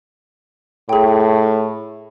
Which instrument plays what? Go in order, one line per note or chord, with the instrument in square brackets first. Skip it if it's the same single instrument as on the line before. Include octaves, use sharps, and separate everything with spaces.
[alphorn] A2 [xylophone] G#4 G5